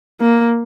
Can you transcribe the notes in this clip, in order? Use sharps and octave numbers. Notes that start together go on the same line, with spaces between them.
A#3